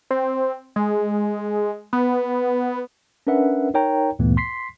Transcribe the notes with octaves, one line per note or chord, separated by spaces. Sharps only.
C4
G#3
B3
C#4 D4 A#4 B4 E5 F#5
D#4 A#4 C#5 G5 A#5
D2 G2 A#2 E3 A3 B3
C6 B6 C7